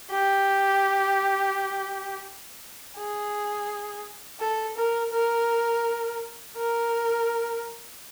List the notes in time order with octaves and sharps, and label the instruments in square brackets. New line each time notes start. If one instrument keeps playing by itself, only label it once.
[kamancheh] G4
G#4
A4
A#4
A#4
A#4